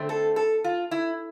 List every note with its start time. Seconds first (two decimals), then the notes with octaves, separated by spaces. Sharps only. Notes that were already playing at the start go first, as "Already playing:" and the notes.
Already playing: D3 A3 C4
0.09 A4
0.36 A4
0.64 F4
0.91 E4